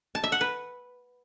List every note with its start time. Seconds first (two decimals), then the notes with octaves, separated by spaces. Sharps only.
0.15 A5
0.24 E5
0.32 F#5
0.41 B4